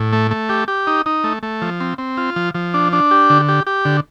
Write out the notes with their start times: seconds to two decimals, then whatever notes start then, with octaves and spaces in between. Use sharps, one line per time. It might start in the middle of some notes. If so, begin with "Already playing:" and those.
Already playing: A2
0.13 A3
0.31 A3
0.49 G4
0.68 G4
0.87 D#4
1.06 D#4
1.24 A3
1.43 A3
1.62 F3
1.80 C4
1.98 C4
2.17 F4
2.36 F3
2.55 F3
2.74 D4
2.93 D4
3.11 G4
3.30 D3
3.49 G4
3.67 G4
3.85 D3